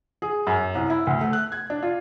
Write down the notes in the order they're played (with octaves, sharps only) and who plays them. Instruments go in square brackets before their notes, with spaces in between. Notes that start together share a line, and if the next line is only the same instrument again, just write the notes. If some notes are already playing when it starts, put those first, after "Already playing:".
[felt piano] G#4
F#2
C2
E4
D2
A3
F#6
G#6
D4
F4